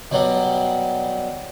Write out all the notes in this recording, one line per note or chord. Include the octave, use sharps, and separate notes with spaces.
B2 F#3 G3